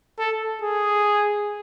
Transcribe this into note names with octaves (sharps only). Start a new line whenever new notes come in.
A4
G#4